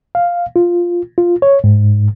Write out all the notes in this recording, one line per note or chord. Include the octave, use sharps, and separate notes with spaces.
F5
F4
F4
C#5
G#2